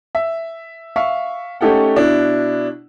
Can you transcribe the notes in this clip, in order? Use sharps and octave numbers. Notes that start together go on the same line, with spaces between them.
E5
E5 F5 C#6
A3 C#4 D#4 G4 A4 F#5
B2 D4 E4